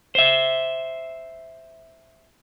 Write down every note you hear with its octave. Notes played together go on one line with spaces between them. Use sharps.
C5 E5